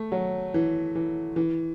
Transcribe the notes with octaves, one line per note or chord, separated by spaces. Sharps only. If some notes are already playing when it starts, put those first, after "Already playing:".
Already playing: A3
F#3
E3
E3
E3